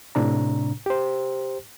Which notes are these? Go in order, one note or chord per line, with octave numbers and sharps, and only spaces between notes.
A2 C3 D4 A#5
G4 C5